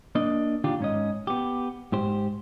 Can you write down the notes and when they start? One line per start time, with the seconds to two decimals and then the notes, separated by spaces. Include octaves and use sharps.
0.15 A#3 D4 D#5
0.64 D#3 D4 F4 G4
0.80 G#2 C#4 D#5
1.27 B3 G4
1.92 G#2 G4 C5